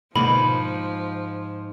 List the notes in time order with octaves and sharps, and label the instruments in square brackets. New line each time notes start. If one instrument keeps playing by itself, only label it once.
[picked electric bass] G#2 [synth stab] B2 D3 A#3 [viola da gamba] F3 [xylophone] B5